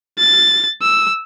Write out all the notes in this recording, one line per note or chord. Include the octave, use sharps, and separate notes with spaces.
A6
E6